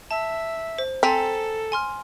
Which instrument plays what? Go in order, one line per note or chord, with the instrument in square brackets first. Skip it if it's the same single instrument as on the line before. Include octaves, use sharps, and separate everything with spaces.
[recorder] E5 [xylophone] A5
[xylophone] C5
[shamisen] C4 [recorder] A4 [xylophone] G#5 A#5 B6
[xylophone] G#5 C6 F6